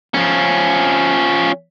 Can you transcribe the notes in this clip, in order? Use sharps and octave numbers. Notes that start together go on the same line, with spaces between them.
F3 C#4